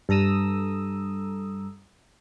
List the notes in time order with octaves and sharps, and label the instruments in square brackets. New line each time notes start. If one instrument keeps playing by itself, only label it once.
[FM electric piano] G2 A4 A#5 D#6 E6